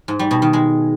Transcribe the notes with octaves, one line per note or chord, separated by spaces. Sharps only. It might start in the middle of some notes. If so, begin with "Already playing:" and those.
G#2
G3
B2
D#3
G#3